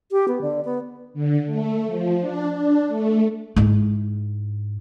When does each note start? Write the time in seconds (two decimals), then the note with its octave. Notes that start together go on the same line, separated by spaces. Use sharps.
0.11 G4
0.28 B3
0.42 D3
0.65 B3
1.14 D3
1.47 A3
1.86 F3
2.21 D4
2.52 D4
2.87 A3
3.56 G#2 E4